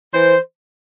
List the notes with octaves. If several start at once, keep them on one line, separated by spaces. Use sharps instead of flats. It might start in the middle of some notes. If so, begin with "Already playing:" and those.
E3 C5